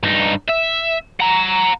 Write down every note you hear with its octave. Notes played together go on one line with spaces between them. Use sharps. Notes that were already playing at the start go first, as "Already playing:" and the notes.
G2 D#4
E5
F#5 A#5